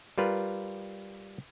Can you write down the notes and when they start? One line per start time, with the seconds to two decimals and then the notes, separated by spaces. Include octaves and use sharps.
0.18 G3 F4 A#4 B4